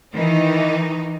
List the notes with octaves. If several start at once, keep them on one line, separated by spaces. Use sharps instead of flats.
D#3 E3 D#4